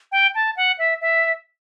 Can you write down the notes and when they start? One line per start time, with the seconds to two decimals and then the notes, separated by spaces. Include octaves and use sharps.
0.12 G5
0.35 A5
0.57 F#5
0.79 E5
1.01 E5